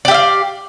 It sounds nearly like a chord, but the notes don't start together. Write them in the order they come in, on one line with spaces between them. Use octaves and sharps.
D5 G4 E5 F5